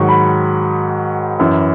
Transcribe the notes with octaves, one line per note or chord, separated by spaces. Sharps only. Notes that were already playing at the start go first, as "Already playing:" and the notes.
Already playing: G#2 D#3 F#3 C#6
B5
F#2 E3